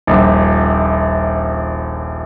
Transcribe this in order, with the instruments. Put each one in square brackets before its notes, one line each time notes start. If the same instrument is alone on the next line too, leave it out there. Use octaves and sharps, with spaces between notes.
[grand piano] D#1 A#1